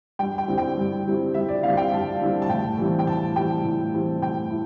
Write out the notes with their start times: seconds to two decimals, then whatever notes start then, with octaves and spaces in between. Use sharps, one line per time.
0.19 G2 G5
0.38 G5
0.48 D3 G3 C4 E4
0.58 G5
0.77 G2
1.06 D3 G3 C4 E4
1.34 G2 E5
1.48 D5
1.63 D3 G3 C4 E4 F5
1.77 G5
1.92 G2 A5
2.21 D3 G3 C4 E4
2.42 A5
2.49 A2 G5
2.78 E3 G3 C4 E4
2.99 G5
3.07 A2 A5
3.35 E3 G3 C4 E4 G5
3.64 A2
3.93 E3 G3 C4 E4
4.22 A2 G5
4.51 E4